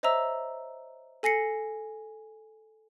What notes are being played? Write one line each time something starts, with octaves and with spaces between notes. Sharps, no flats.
C5 C#5 D#5 E5 A#5 E6
A4 G#5 A#6 C7 C#7